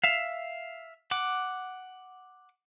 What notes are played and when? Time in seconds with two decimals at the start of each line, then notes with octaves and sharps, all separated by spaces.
0.04 E5 F5
1.11 F#5 D6